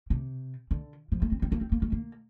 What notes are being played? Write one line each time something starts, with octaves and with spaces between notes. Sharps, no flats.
C3
D3
F3
A3
C4
C4
A#3
C4
A#3
A3
A#3